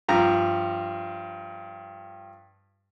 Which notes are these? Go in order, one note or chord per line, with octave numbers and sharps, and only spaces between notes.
G2 F3 A#5